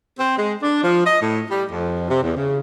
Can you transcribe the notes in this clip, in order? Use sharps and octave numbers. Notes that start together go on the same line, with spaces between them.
C4
G#3
D4
F3
D#5
A2
G3
F2
C3
E2
C#3